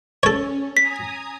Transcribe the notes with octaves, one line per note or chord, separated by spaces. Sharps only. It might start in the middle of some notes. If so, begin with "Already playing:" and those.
C#4 A4 C#5
G#5 A#5 D#6 B6